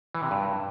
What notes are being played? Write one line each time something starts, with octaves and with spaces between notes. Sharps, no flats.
E3
C3
G2